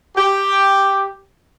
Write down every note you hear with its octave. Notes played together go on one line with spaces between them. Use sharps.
G4